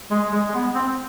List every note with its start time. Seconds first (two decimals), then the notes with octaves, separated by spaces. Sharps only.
0.11 G#3
0.32 G#3
0.49 G#3
0.54 B3
0.75 C4